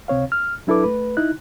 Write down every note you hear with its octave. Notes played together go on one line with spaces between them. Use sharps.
C#2 C3 C4 C#5 F5
F6
F#3 D4 E4 A4 B4 D6
A3 B4
D#4 E4 F#6